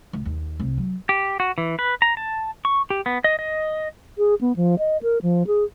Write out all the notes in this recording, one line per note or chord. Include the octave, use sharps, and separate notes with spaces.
C#2
D#2
C2
F#3
G4
F#4
E3
B4
A#5
A5
C#6
G4
B3
D#5
D#5
G#4
B3
F3
D#5
A#4
F3
G#4